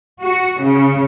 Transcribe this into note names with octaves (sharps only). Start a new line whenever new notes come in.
F#4
C#3